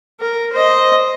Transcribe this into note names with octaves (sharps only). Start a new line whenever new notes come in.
A#4
C5 D#5